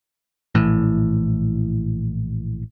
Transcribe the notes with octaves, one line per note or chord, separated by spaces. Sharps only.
A#1 A2 E3